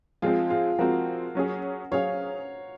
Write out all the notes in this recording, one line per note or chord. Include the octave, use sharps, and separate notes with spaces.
F3 G#3 C4 F4 G#4
F4 G#4
F3 G#3 C4 F#4 A#4
F#3 C#4 G#4
F#3 C#4 G#4 C#5 F5